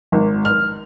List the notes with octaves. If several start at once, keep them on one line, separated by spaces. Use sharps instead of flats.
G#1
F6